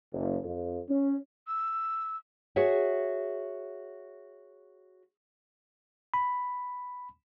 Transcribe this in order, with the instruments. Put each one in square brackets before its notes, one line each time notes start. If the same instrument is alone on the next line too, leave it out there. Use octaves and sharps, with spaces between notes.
[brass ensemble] F#1
F2
C#4
[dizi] E6
[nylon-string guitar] F#4 G#4 C#5 E5 F#5
[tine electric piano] B5